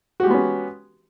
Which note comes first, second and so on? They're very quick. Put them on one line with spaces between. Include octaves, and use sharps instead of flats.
F#4 G4 G#3 B3 C#4